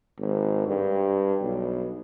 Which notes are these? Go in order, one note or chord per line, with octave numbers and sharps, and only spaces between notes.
G#1
G2
B1